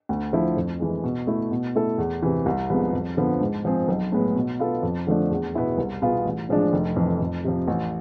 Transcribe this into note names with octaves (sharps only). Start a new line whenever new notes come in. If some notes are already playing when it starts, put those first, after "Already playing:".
D2
D3 F3 A3 E4
F2
E3 G#3
B2
A3 E4
B2
A3 E4 A4
E2
C3 E3
C2
C3 F3 G#3 B3
F2
D3 F3 B3
G#2
F3 G#3 C4 G#4
B1
A2 G#3 B3
B2
B3 F4 A4
F2
D3 F3 A3 D4
E2
B2 B3 E4 G#4
C2
B2 B3 F4 G#4
A1
A2 F3 G#3 D4
F1
F2 E3
F2
C3 F3
A1